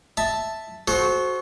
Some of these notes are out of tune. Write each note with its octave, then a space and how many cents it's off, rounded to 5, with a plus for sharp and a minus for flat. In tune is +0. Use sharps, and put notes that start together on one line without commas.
E5 +0 A5 +0
F#4 +0 A4 -40 C5 +5